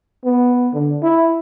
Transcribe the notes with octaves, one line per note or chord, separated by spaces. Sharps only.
B3
D3
E4